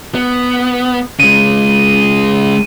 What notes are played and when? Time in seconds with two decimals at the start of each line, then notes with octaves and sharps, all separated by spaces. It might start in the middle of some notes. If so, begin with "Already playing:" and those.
0.15 B3
1.20 C#3 G#3 D#7